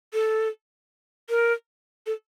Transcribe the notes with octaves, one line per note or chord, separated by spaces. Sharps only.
A4
A#4
A4